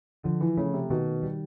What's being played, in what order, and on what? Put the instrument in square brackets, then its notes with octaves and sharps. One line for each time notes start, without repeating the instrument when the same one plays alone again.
[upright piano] D3 [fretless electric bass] F3
[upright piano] E3
[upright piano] C#3 [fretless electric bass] A3
[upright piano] C3
[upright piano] B2 [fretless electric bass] D#3
[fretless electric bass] G3